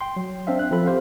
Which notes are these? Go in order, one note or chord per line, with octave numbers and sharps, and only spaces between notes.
G5 C6
F#3
C4 D4 E5 F5
F#6
F3 C4 A4 B5
G4 C5 F5